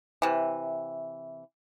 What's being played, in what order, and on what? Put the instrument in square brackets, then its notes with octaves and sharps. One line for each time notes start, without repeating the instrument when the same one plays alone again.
[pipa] C3 E3